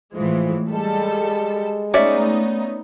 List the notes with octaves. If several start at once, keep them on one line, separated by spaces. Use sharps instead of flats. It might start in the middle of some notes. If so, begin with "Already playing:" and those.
A2 E3 F3 G#3
G3 G#3 A4
A3 B3 C#4 D#4 D5 E5